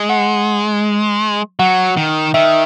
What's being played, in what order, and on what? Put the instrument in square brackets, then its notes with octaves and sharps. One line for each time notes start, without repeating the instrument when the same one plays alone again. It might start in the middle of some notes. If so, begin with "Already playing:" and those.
Already playing: [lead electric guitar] G#3
[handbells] F#5
[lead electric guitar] F#3 [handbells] F#5
[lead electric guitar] D#3
[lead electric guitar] D#3 [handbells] E5